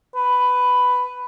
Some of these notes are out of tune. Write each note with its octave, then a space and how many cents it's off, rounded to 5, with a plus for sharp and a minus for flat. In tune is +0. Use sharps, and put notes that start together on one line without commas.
B4 +10